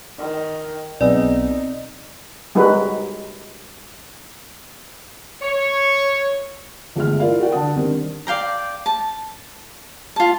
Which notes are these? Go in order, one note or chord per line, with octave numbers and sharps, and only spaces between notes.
D#3
B1 B3 C4 D#4 G#4 D5 D#5 E6
G3 G#3 D#4 F#4 B4
C#5
G1 G#3 A3 E5 F6
E4 F4 A#4 D5 F5
F#4 A4 A#4 D5 F#5 G5
D3 F#5 A5 D#6
D#3 G3 C4 D4
D5 F5 G5 A#5
A5
F4 A5